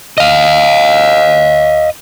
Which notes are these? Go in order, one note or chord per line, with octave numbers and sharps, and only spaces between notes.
D#5 F5